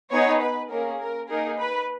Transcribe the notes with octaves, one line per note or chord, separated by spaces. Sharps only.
B3 D#4 G#4 C#5
B4
A#3 C#4 G#4 A#4
A#4
A#3 D#4 G#4 A#4
B4